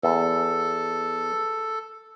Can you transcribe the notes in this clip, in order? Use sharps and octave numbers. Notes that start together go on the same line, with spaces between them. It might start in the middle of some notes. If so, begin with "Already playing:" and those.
E2 A4